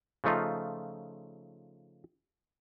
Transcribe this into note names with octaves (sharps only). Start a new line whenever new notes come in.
C#3 F3 A3 D#4 F4